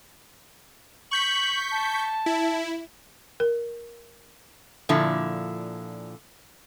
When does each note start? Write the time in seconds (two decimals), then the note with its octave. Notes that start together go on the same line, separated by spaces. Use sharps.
1.11 C#6 G6 B6 F#7
1.71 A5
2.26 E4
3.40 A#4
4.89 A#2 D3 F3 E4